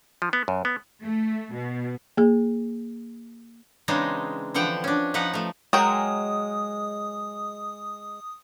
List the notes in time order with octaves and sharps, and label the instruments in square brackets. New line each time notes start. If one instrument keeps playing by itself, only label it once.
[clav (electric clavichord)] F3
B3
F#2
B3
[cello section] A3
B2
[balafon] A#3 G#4
[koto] C#3 E3 G#3 C4 D4 D#4
D3 E3 F3 F#5 G5
C#4 D4
F3 D#4 B4 F#5
F3 A3
[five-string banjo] F#3 A#4 G5 [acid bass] G#3 [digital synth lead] D#6